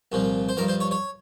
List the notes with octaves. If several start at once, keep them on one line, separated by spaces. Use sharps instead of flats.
C2 A#2 F3
C5
G2 F3 A#4
C5
C#5
C#5